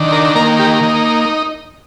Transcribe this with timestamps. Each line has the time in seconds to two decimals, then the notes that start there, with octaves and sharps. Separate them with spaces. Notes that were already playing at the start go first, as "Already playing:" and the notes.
Already playing: D#3 D4
0.12 A#4
0.35 A#3 A#4
0.59 G4
0.82 D#4